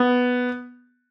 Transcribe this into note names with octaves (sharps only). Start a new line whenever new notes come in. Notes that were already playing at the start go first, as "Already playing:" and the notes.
Already playing: B3